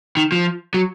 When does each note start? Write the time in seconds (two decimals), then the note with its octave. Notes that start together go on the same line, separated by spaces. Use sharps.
0.17 D#3
0.32 F3
0.74 F#3